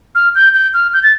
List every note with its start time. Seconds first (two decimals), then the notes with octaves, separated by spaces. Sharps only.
0.15 F6
0.35 G6
0.54 G6
0.74 F6
0.93 G6
1.03 A6